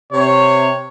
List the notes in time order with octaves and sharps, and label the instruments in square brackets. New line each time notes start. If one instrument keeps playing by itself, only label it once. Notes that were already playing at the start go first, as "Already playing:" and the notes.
[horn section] C3 [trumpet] C#5